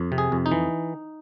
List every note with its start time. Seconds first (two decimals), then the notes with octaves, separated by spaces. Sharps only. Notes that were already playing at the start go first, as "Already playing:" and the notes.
Already playing: F2
0.12 C3
0.18 G#4
0.32 F2
0.46 D#4
0.52 E3